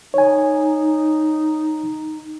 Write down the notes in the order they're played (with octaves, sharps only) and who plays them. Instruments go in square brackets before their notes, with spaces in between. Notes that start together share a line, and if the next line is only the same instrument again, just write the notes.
[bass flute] D#4 [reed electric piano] C#5 G#5